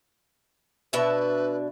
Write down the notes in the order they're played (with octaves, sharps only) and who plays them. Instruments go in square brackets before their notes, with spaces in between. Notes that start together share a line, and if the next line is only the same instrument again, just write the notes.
[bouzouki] B2 D4 E5 [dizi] B4